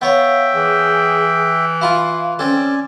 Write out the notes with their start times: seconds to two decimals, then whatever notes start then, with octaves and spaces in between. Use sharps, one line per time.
0.02 B3 C#5 E5 F5 G5
0.54 E3 G#4
1.81 E4 F4 F5
2.39 C4 C#4 A4 D5 G#5